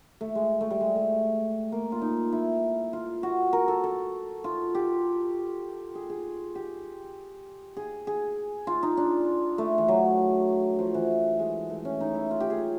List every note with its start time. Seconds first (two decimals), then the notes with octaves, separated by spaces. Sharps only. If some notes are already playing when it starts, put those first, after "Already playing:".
0.21 A3
0.35 G#3
0.61 A3
0.70 G3
0.81 G#3
0.96 A3
1.72 A#3
1.92 F4
2.01 D#4
2.33 E4
2.93 F4
3.23 F#4
3.53 A#4
3.68 A4
3.84 A4
4.44 F4
4.75 G4
5.95 G#4
6.10 G#4
6.55 G4
7.77 G#4
8.07 G#4
8.67 F4
8.83 D#4
8.97 D4
9.58 A3
9.78 E3
9.88 F#3
10.79 F3
10.94 E3
11.39 G#3
11.70 A3
11.85 C#4
12.01 D#4
12.15 E4
12.31 F4
12.40 G4
12.50 G#4